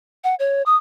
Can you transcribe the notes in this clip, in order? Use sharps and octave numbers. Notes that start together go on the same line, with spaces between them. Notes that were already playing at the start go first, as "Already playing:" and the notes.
F#5
C#5
D#6